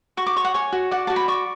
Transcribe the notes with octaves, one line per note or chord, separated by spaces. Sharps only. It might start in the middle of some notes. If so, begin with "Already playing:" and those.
F#4 C#6
D6
C#5 C#6
F#5
C#5 G#5
F#4
D5 F#5
F#4 A5
B5
D5 C#6